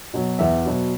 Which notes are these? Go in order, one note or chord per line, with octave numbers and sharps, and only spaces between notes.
B2 F#3
E2 E5
B2 F#3